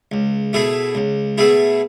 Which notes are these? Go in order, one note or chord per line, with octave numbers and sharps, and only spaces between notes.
C#2
B2 A3 E4 G#4
C#2
B2 A3 E4 G#4